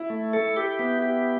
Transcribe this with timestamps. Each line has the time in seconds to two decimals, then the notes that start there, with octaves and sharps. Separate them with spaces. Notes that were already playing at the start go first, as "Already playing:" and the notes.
Already playing: E4
0.10 A3
0.33 A4
0.56 G4
0.79 B3
1.02 G4